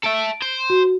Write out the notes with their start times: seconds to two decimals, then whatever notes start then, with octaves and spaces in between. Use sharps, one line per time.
0.04 A4 E5 D7
0.42 C5
0.70 F#4